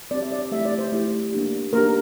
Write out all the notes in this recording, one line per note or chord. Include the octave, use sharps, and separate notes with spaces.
C4 G4 D5
E5
D5
A3 E4 G4 E5
D5
C5
A3 E4 G4
A#3 D4 G4
A#3 D4 G4 A#4